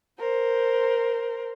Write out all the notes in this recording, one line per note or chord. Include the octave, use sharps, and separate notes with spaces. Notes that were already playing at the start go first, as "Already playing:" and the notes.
A#4 C5